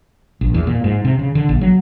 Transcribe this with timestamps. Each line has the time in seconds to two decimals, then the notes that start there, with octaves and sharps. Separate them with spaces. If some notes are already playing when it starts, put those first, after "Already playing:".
0.41 A#1
0.54 E2
0.67 A#2
0.84 G#2
1.05 C3
1.19 C#3
1.35 D3
1.49 A#1
1.61 F#3